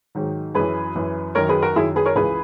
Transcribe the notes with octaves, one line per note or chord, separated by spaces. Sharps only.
G#2 D#3 F#3
F#2 E3 G#4 B4
F#2 E3
F#2 D#3 F#3 A#4 C#5
G#4 B4
F#4 A#4
F#2 D#3 F#3 E4 G#4
G#4 B4
A#4 C#5
C#2 C#3 E3 G#4 B4